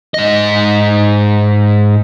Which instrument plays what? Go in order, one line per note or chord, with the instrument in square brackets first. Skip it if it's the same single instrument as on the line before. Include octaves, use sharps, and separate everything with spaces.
[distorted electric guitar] G#2 D#5